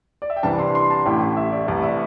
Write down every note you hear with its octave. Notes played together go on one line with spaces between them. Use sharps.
D5
E5
G5
C2 C3 E3 G3 D4 A5
C6
C6
A5
A1 A2 A3 E4 G5
E5
D5
C2 C3 E3 A3 D5
E5